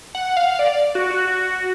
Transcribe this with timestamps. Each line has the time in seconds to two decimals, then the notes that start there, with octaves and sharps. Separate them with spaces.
0.15 F#5
0.37 F5
0.59 D5
0.95 F#4
1.11 F#4